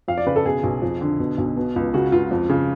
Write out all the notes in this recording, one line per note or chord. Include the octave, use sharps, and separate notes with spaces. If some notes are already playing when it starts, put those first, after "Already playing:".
F2 F5
D5
C#3 B4
A4
B2 G#4
B1
F2
D3
B2
B1
B2
C#2
C#3 F#4
C#2 F4
F2
C#3